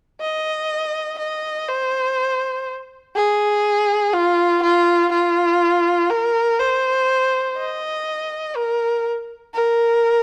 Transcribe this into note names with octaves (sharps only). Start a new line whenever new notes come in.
D#5
D#5
C5
G#4
F4
F4
F4
A#4
C5
D#5
A#4
A#4